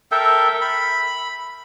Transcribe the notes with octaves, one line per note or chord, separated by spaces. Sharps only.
A4 A#4 E5 G5
B5